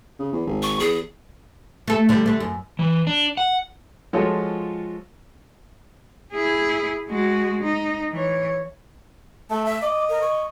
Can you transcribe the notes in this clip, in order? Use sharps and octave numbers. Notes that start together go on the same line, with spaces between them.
C#3
E2
G#1
C#6
E2 G#4
A3 A4
D3 G3
D3 A3
F#2
E3
D4
F#5
F3 G#3 F4 F#4 A4 C#5
E4 G#4
G#3 F#4
D#4
E3 C#5
A3 A5
E5
D#5 D6
A#4
C#6